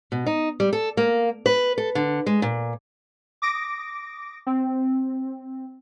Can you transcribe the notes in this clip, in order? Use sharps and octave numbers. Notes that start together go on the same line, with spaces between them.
B2
D#4
G3
A4
A#3
B4
A4
D3
G#3
A#2
D6 D#6 A#6 D7
C4